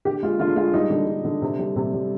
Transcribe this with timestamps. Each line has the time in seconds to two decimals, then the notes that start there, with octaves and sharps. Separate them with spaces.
0.05 D3 G4
0.23 G#3 F4
0.39 D3 F4
0.56 G#3 F4
0.73 G3 D#4
0.90 D3
1.07 D3
1.25 D3
1.42 C3
1.59 G3
1.76 C3
1.93 G3